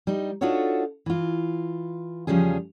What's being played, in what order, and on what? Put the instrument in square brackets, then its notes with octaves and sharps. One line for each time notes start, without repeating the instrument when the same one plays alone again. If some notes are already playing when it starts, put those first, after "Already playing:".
[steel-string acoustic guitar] G3 D#4
D4 D#4 F4 F#4 A4 C#5
E3 F4
E2 C#3 F3 G3 C#4 G#4